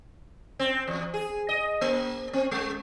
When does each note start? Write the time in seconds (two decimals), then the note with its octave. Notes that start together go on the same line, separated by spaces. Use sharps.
0.59 C4
0.88 E2
1.14 G#4
1.49 D#5
1.81 A#3
2.33 C4
2.51 G#3